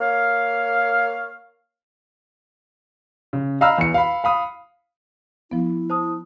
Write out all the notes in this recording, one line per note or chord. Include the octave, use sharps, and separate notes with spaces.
A#3 C#5 F5
C#3
D#5 F5 A#5 B5 E6 F6
E2 C#7
F5 B5
F5 B5 D#6
F3 B3 E4
C5 A5 D#6